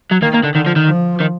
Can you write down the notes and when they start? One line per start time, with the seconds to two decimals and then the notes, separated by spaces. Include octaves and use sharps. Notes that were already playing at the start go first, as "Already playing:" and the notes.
0.11 F#3
0.22 D#3 A#3
0.34 A#3
0.43 D3
0.55 D3 D#3
0.66 F3
0.76 D#3
0.87 F3
1.21 D#3